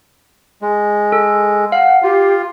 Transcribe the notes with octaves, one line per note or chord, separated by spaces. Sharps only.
G#3
A4
F5 F#5
F4 G4